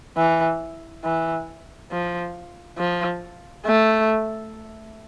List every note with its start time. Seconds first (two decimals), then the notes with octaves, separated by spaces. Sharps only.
0.17 E3
1.04 E3
1.92 F3
2.78 F3
3.66 A3